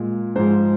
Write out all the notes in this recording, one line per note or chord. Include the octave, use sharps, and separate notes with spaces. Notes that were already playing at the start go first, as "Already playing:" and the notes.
Already playing: A#2 G#3
G#2 F3 G#3 C5